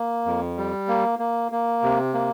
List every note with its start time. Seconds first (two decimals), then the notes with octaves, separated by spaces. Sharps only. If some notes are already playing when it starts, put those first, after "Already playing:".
Already playing: A#3
0.26 F2
0.57 G3
0.88 A#3
1.19 A#3
1.52 A#3
1.83 C3
2.14 A#3